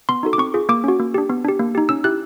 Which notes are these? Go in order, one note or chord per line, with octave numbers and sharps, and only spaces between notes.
B3 C6
D#4 F#4 A4
D6
C4 C#6
F4 G#4
A#3 D6
C#4 F#4
A#3
D4 G4
B3
D4 G4
A#3
D#4 G4
C#4 E6
E4 G4 F#6